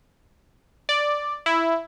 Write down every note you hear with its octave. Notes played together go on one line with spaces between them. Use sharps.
D5
E4